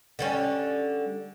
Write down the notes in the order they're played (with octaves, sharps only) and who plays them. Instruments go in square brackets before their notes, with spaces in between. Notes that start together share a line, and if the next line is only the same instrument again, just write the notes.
[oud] D3 G3 C#4